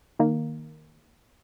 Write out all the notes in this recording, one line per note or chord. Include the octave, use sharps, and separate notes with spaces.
D#3 A#3